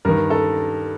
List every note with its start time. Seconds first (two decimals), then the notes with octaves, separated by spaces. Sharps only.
0.05 G2 D#3 A#4
0.30 A4